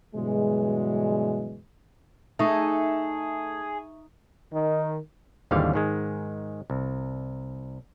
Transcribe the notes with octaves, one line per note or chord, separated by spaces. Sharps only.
G2 B2 D3 E3 F#3 G#3
A3 D#4 G#4 A4 E5 C#6
D#3
G#1 D#2 D3 E3 G3 F5
G#2 D#3 G#3
C2